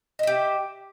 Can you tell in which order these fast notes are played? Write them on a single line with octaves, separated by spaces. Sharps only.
D#5 E5 G4